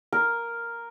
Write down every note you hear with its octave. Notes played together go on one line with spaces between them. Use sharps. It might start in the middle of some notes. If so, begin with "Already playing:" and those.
A#4